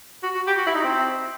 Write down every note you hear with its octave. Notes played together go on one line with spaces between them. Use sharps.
F#4
F#4
G4
F#4
E4
D#4
C4